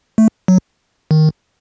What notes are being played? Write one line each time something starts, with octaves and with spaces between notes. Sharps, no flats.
A3
F#3
D#3